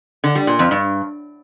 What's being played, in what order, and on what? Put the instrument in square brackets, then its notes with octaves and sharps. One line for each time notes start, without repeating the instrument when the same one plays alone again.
[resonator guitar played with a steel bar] D3
G3
A#2
F2
G2